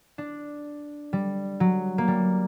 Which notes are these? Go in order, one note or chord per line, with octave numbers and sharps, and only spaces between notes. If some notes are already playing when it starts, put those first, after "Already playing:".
D4
G3
F#3
A#3
G3